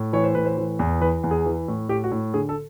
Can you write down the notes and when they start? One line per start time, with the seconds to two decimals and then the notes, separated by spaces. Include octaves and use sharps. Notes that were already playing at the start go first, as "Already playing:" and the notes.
Already playing: A2
0.13 E3 C#5
0.24 C5
0.35 A2 B4
0.46 C5
0.57 E3
0.79 E2
1.01 E3 B4
1.23 E2
1.31 G#4
1.46 E3
1.68 A2
1.89 A2 G4
2.04 F#4
2.11 A2
2.34 D3 G#4
2.49 A4